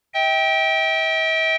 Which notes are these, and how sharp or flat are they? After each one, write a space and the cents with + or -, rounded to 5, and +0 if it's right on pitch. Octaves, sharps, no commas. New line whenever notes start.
E5 -45 G5 +0